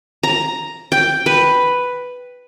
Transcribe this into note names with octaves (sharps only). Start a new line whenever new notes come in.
A#5
G5
B4